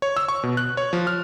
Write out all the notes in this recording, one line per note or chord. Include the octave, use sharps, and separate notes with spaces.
C#5
E6
C#6
B2
F#6
C#5
F3
F6